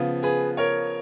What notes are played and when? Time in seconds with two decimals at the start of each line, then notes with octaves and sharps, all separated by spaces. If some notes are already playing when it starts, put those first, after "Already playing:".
Already playing: C#3 F3 B3
0.23 G#4 B4
0.57 A#4 C#5